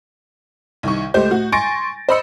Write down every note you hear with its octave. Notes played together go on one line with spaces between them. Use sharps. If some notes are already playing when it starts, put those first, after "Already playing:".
C2 D#3 C#6
C#2 A3 G4 C5 G6
A2 F#4
G#5 C6 C#6 A6 A#6 D7
C5 D#5 B5 E6 C#7